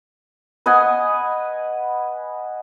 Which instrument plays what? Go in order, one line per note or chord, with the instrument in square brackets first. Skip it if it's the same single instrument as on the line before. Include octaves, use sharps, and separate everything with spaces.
[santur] B4 D#5 F#5 G#5